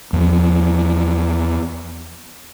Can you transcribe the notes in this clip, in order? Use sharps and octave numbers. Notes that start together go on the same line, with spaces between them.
E2 F3